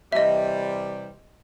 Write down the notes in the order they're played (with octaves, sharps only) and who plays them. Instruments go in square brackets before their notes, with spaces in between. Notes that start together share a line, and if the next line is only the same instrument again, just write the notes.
[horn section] C3 E3 G3 [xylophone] D#5 E5